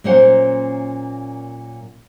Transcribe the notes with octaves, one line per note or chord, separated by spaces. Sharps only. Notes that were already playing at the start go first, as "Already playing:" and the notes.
A#2 F#3 A#3 C#4 C5 F#5